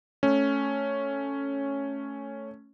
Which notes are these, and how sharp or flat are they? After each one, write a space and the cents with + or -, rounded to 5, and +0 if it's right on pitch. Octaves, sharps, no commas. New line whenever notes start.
A3 +0 C#4 +0